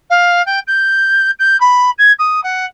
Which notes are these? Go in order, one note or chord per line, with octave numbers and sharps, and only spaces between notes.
F5
G5
G6
G6
B5
G#6
D#6
F#5